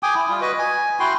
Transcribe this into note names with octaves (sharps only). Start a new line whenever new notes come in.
G5 G#5 D6 D#6
E4
G3 F4
F#4 B4 D#5
G#5
E4 F#4 G5 C6